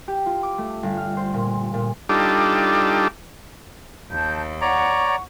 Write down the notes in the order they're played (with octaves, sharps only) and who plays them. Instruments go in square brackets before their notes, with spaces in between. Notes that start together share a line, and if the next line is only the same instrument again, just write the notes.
[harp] G4
F4
D6
A3
G1
F6
C5
A#2
A#2
[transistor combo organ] G3 D4 D#4 F4 G4 A4
[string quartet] D#2 [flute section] A5 G6
[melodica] C#5 D5 A#5 [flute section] F#5 C#6